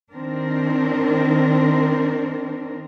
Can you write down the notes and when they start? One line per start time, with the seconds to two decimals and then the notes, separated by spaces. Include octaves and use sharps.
0.11 D#3 C4 D4 A#4